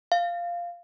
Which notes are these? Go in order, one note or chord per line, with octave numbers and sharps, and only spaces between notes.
F5